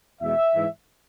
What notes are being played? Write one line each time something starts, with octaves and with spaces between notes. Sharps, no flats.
E2 B2 G#3 E5
G#2 E3 G#3